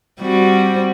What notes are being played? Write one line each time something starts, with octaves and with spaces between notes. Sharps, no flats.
G3 C4 F#4